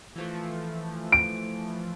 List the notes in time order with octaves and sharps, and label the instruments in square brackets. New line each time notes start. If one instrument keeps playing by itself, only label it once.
[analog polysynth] E3 F3 A3
[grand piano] D7